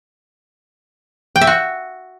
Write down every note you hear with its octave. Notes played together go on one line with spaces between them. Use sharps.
G5
E5
F#4